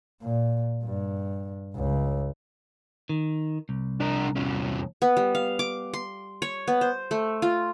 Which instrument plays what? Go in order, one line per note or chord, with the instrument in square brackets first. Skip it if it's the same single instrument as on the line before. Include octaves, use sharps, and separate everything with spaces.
[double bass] A#2
G2
C#2
[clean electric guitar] D#3
C2
[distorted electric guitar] D4 A#4
E2 C#4
[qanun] B3
G3
F5
D6
C6
C#5
B3
C5
A3
F4